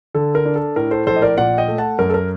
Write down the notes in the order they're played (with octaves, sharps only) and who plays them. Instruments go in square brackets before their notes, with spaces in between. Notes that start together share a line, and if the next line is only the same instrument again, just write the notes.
[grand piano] D3 A4
A#4
D4
A4
A2 A#4
A4 C5
A#1 A4 C5
D#5
A#4 D5
A#2 D5 F#5
D#5 G5
A3
F#5 A5
F#2 A#4
A4
A#4